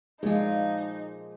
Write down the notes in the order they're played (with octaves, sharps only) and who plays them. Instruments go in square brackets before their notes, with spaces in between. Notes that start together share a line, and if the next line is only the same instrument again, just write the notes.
[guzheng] A#2 F3 [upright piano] G#3 [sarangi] D#4